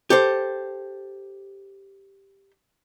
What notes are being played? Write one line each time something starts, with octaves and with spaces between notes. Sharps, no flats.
G4 A4 C5